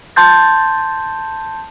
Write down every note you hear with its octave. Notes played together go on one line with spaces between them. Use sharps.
A5 C6 G6 A6